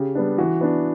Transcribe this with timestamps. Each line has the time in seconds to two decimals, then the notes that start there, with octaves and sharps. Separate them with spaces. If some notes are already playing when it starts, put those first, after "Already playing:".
Already playing: C#3 G4
0.15 G3 B3 D4
0.38 E3 F#4
0.61 B3 D4